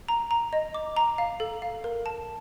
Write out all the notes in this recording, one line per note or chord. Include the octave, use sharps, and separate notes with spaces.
A#5
A#5
D#5
D6
A#5
F5
A4
F5
A#4
A5